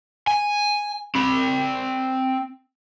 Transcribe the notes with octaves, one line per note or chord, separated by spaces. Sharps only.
G#5
C4 B5